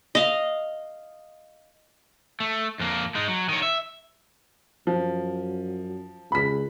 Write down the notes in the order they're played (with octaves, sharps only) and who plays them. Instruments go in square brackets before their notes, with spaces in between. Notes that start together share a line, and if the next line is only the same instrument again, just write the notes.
[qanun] D#5 F5
[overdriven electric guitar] A3
F2 A#3
G#3 D#4
F#3
D#3 C#5
E5
[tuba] F#2 [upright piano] F3
[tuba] C#2 [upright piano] B5 B6